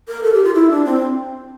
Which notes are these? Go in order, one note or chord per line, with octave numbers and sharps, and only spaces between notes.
A#4
A4
G4
F4
E4
D4
C4